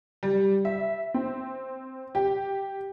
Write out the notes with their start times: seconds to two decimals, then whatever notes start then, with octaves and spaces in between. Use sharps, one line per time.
0.23 G3
0.65 E5
1.14 C4
2.15 G4